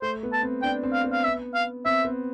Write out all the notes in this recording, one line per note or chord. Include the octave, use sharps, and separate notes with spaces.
A3 C5
B3
A5
C4
D4 G5
C4
F5
B3
F5
E5
F5
C4 E5
B3